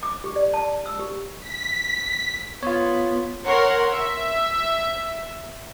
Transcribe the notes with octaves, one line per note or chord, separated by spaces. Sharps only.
D6
G4
D5
A5
E6
G4
B6
B3 F4 C#5
A#4 C#5 F#5 C6
E5